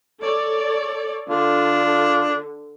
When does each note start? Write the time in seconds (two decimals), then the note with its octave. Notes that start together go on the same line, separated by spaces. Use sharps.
0.21 A4 C#5 D5
1.29 D3 D4 F4